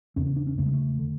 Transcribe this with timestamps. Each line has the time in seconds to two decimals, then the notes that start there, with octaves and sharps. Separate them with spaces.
0.16 E2 C#3 C#4
0.27 C#4
0.36 D4
0.47 C#4
0.58 E2 C#3 A3
0.66 G#3
0.73 A3
0.99 D3